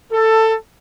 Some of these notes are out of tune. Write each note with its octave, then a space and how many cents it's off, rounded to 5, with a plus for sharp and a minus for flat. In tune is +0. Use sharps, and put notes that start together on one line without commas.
A4 +15